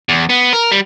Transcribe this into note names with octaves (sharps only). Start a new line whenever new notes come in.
E2
B3
A#4
G3